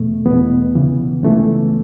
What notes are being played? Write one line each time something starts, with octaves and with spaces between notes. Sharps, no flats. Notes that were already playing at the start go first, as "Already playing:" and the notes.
Already playing: E2 B2 A3
E2 B3
B2
C#2 C#3 E3
C#2 C#3 E3 A3